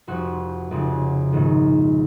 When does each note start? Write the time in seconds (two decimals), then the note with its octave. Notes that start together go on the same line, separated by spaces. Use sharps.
0.07 F1 F2 F3 F#4
0.71 F1 F2 C#3
1.33 A#1 G#2 D#3